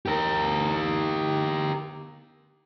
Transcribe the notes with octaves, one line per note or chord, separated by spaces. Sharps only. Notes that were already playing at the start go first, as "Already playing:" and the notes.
G4 A#4